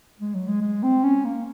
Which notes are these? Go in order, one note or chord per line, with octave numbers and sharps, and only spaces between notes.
G#3
F#3
G#3
G#3
C4
C#4
A#3